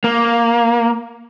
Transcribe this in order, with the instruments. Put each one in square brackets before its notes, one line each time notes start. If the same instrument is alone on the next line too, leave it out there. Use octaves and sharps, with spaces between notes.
[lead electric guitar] A#3